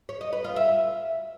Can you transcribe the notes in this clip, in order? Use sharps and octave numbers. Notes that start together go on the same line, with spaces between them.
C#5
D#5
B4
F4
E5